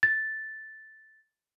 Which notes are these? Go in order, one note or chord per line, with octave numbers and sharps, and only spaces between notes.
A6